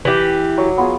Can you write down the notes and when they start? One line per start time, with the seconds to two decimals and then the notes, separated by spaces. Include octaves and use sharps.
0.05 E3 G4
0.58 F#3 F#4 D6
0.78 B3 F4 G#4